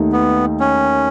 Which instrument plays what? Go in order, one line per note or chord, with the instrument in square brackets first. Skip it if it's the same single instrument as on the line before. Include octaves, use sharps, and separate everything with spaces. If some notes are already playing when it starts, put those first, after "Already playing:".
Already playing: [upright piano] D#2 D#3 A3 D#4
[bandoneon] B3
C#4